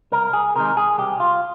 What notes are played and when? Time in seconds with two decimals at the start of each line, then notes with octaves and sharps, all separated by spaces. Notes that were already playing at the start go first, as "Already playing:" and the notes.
0.12 C2 A#4
0.33 G#4
0.56 C3 D#3 G#3 A#4
0.77 G#4
0.98 C2 G4
1.20 F4